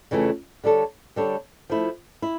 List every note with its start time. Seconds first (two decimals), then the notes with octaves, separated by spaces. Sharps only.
0.11 F2 C#3 E3 A3
0.64 D3 G3 D4 A4 C#5
1.16 D3 G3 D4 A4 C#5
1.70 F3 A3 E4
2.22 E4